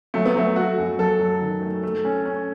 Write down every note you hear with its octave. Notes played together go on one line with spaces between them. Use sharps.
F#3 A3
B3
F#3 A3
A3 F#4
F#2
F#2 A4
F#3
D#3
A3
A3
C#4
C#4